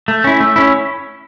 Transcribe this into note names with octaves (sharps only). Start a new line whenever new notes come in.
A3
C#4 E4
A3
C#4 E4